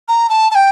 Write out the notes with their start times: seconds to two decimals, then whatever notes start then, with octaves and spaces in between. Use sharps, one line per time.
0.08 A#5
0.29 A5
0.51 A5
0.55 G5